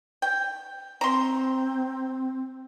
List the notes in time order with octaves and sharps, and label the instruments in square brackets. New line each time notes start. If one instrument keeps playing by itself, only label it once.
[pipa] G5
[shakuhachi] C4 [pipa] A#5 C6